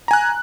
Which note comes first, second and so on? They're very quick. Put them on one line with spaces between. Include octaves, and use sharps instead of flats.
A#5 G#5 F#6